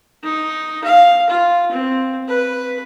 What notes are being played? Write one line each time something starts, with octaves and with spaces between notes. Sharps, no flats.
D#4
F5
F4
C4
B4